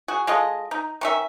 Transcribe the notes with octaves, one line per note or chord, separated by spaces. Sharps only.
F#4 G#4
G#3 F4 A4 D#5
D#4
D#3 C#4 E5